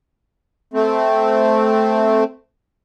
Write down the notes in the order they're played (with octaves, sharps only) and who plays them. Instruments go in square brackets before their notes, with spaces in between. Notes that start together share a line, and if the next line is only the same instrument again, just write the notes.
[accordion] A3 C4